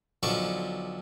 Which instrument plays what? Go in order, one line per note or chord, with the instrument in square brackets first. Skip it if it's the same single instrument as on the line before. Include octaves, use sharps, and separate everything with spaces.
[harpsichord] B1 D3 F3 D5 A5 C#6